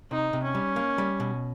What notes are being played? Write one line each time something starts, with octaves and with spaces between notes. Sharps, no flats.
C3 D#4
C3
C#4
G3
A#3
G3
B2